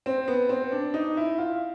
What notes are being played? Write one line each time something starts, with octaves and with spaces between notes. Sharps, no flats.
C4
B3
C4
D4
D#4
E4
F4